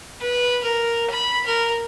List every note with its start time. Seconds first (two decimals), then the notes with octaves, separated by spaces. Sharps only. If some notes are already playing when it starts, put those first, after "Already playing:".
0.21 B4
0.63 A#4
1.10 B5
1.46 A#4